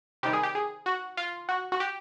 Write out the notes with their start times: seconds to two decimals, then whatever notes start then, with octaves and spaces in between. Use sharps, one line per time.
0.23 C3 D#3 G3 G4
0.33 G#4
0.43 G4
0.55 G#4
0.86 F#4
1.17 F4
1.49 F#4
1.72 F#4
1.80 G4